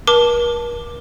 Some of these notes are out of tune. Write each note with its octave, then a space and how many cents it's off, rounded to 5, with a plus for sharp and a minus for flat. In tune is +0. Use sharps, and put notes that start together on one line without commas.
A#4 +40 A5 +0 D6 +5